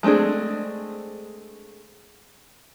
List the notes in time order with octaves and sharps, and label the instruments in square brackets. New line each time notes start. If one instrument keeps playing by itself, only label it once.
[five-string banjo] G#3 A3 C4 D4 G#4